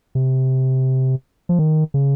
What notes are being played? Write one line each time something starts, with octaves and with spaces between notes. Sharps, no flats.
C3
F3
D#3
C#3